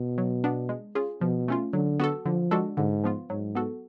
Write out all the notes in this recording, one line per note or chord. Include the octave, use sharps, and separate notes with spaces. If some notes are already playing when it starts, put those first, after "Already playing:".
Already playing: B2
F#3
B3 D4
G#3
C#4 F4 G#4
B2 F3
A3 C#4 F4
D3 F#3
B3 F#4 A4
D3 F3
G#3 D4 F#4 A4
G#2 D3
F3 B3 F4
G#2 F#3
B3 F#4 A4